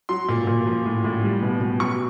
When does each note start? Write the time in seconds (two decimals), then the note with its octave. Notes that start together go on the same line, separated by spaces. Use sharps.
0.09 F#3 C6
0.29 A#2
0.47 A#2
0.66 F3
0.85 A2
1.04 A2
1.23 G3
1.42 B2
1.61 B2
1.80 F#3 C#6